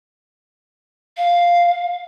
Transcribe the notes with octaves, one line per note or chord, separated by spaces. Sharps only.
F5